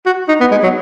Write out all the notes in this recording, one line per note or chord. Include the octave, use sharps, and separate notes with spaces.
F#4
D#4
B3
G#3
F#3